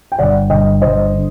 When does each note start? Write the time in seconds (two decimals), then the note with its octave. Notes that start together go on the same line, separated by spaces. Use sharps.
0.12 G5
0.19 G1 D5 F#5
0.50 G1 D#5 G5
0.82 G1 C5 D#5
1.14 D3